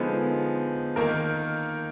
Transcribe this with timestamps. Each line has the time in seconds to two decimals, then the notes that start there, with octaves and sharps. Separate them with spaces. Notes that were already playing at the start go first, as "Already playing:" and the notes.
Already playing: D3 F3 G#3 B3 D#4
0.96 D#3 A#3 D#4 A#4